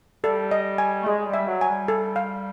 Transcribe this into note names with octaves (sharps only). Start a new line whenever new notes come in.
G3 A4
D#5
G#5
A3
G#3 G#4
G3
E5
F#3
G#5
G3
A4
F5